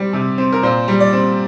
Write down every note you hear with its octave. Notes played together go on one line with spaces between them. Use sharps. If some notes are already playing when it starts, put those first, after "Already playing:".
Already playing: G3 C4
C3
C4
A#4
A#2 C5
G3
D5
C4